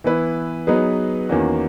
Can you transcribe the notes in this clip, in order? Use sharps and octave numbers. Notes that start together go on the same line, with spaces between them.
E3 B3 E4 B4
F#3 B3 D#4 G#4 B4
E2 D#3 A#3 C#4 F#4